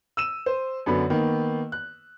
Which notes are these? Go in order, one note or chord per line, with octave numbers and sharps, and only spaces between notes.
E6 D#7 E7
C5
F#2 D3 B3 B5
D#3 A#3 B3
F#6